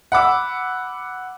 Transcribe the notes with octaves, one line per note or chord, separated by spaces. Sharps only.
F#5 B5 D6 E6